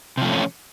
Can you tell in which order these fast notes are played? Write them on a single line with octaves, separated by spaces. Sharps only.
C3 F3 A3 C#4